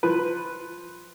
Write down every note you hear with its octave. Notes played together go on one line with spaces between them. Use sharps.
F3 B4